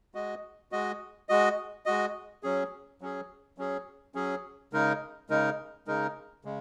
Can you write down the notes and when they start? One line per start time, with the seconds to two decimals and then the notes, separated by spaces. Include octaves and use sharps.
0.14 G#3 F#4 D#5
0.72 G#3 F#4 D#5
1.29 G#3 F#4 D#5
1.86 G#3 F#4 D#5
2.43 F#3 C#4 G#4
3.01 F#3 C#4 G#4
3.58 F#3 C#4 G#4
4.15 F#3 C#4 G#4
4.73 C#3 G#3 D#4 A#4
5.29 C#3 G#3 D#4 A#4
5.87 C#3 G#3 D#4 A#4
6.45 C#3 G#3